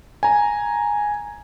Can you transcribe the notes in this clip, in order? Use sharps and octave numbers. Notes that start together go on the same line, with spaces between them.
G#5 A#5